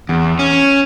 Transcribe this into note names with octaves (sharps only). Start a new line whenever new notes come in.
E2
C#4